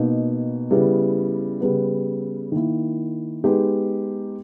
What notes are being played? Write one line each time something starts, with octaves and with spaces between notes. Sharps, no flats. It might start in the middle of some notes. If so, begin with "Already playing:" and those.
Already playing: B2 A#3 D#4
C#3 G3 B3 E4
C#3 G3 B3
D#3 A#3 E4
G#3 B3 D#4 G4